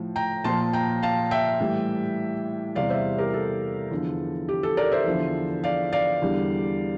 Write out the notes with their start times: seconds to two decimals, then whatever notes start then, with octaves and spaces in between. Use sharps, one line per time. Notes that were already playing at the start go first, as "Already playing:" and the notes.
Already playing: A2 F3
0.16 G5 A#5
0.44 A#2 F3 A5 C6
0.73 G5 A#5
1.02 F5 A5
1.31 E5 G5
1.60 A2 E3 G3
2.76 E2 C3 G3 D5 F5
2.90 C5 E5
3.18 G4 A#4
3.34 A4
3.91 E2 D3 F3
4.49 G4
4.63 A4
4.77 A#4 D5
4.91 C5 E5
5.06 E2 D3 F3
5.64 D5 F5
5.92 D5 F5
6.22 E2 D3 G3